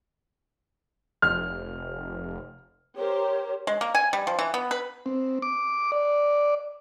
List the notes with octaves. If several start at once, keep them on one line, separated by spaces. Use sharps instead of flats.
F1 F6
G4 A#4 C5 C#5
G#3
A#3
G#5
G3
F3
E3
B3
B4
C4
D6
D5